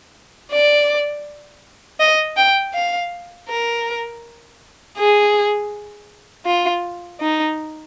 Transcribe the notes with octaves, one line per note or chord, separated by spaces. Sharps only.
D5
D#5
G5
F5
A#4
G#4
F4
D#4